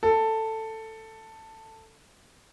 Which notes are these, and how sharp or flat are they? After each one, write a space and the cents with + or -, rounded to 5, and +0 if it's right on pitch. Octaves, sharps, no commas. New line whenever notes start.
A4 +10